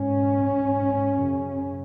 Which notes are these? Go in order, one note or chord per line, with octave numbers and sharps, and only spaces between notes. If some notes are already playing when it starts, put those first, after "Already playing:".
Already playing: G#2 C#4
G#2
F#2 C#3